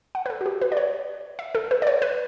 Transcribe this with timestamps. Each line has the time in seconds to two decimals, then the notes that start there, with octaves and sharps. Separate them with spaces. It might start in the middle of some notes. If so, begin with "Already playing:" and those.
0.15 F#5
0.26 B4
0.30 A4
0.41 F#4
0.46 G4
0.61 B4
0.72 D5
0.77 C#5
1.39 E5
1.55 A4
1.71 B4
1.82 D5
1.87 C#5
2.02 B4